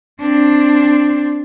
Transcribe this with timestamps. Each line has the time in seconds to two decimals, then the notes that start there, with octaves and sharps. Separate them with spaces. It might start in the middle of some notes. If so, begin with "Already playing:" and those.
0.21 C4 D4